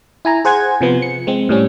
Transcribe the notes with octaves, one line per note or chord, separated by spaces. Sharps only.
E4 G#5 A#5
G#4 C5 F#5 G#5 G#6
C3 F3 B3
C#7
G#3 C4
A2 G3 C#4